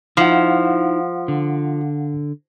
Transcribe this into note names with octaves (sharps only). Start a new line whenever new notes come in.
F3 D#4 E4 F5 F#5
D3